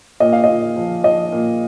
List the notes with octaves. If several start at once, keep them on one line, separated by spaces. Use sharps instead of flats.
A#2 D#5
F5
D#5
A#2
F3
F3 D#5
A#2